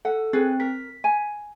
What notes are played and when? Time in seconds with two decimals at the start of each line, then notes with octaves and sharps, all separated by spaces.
0.05 A4 F#5
0.33 C4 G#4 B4
0.60 A#4 B6
1.04 G#5